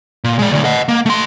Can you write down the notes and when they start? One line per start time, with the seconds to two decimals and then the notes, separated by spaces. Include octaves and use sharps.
0.24 A#2
0.39 G#3 D5
0.52 D2 A2
0.65 D#5 F#5
0.88 A#3
1.06 A3 C6